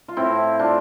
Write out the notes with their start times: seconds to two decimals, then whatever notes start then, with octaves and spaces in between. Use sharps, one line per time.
0.08 F4
0.17 A2 C4 E4
0.59 A2 D4 F4